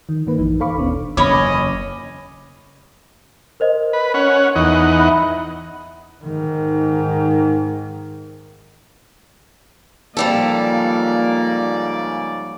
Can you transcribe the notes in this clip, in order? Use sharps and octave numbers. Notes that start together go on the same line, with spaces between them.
D#3
G#2 D#3 A#3 B4
A#1 F#2 E3 D#4
A4 C5 F5 B5 C#6 D6
G1 D#2 B2 B3 C#4 D4
F#1 E2 C#3 C#4 C#5 D#5 B5 D6
A#4 C5 D#5
B4
C#4 F#5
E2 D#4 F#5
E5 B5
G#2 D#3
G#2 C#3 F3 G3 A#3 A4 D5